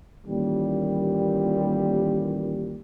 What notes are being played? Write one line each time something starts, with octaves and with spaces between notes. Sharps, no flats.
A1 D#2 A#2 G3